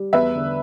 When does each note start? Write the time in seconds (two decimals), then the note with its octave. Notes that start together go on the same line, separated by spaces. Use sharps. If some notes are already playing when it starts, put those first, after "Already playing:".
Already playing: G3
0.13 E2 B4 E5
0.35 D3